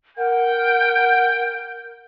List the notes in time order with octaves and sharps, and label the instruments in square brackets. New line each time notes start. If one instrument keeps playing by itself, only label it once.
[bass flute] A#4 [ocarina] F#5 [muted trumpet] G5